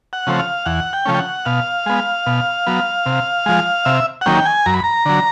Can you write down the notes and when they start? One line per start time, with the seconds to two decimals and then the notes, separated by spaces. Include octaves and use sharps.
0.13 F#5
0.27 C#3 F3 A3 C4
0.39 F5
0.66 E2 F#5
0.93 G5
1.06 C#3 F3 A3 C#4
1.14 G5
1.19 F#5
1.45 B2 F5
1.86 G#3 B3
2.26 B2
2.67 F#3 B3
3.06 C3
3.46 F3 G#3
3.85 C3 E5
4.21 F#5
4.26 D#3 F#3 A#3 C#4 G5
4.45 G#5
4.66 F#2 A#5
4.74 B5
4.84 A#5
5.06 D3 F#3